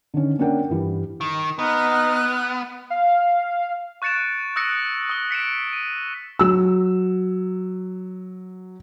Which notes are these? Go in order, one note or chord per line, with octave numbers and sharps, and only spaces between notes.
D3 D#3 C#4
A#3 C#4 D4 A#4 F#5 G5
G2 E3 G3
D#3
B3 D#4 F6 F#6
F5
C#6 F#6 A6 C#7 D7 E7
D#6 E6 F#6 A#6 C#7 D7
D#6 G7
B6 C#7 D7 E7
D#7
F#3 E6